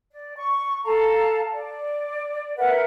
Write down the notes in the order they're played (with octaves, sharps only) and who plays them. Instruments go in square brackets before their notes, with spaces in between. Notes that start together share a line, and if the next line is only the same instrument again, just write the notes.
[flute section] D5
C#6
A4 F5 A5 A#5
D5
A#4 B4 E5 F#5